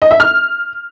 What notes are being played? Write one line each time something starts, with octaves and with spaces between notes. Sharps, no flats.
D#5
E5
F6